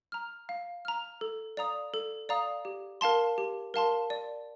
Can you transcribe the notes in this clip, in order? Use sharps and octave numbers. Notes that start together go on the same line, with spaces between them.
A#5 F6
F5
A#5 F6
A4
D5 F5 A#5 D#6
A4
D5 F5 A#5 D#6
G4
A#4 F5 A5 C6
G4
A#4 F5 A5 C6
D5